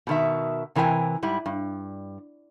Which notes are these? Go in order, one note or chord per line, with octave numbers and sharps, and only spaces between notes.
B2 D#3 E5
C3 E3 A#4 D5 G5 G#5
G#2 G3 E4
G2